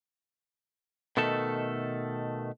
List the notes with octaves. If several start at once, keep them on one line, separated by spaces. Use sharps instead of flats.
B2 D#3 A3 A4 E5